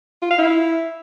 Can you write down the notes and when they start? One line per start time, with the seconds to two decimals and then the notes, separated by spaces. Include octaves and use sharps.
0.22 F4
0.30 F5
0.39 E4